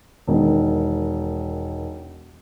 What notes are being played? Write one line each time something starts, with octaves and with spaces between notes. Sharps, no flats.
E1 D#3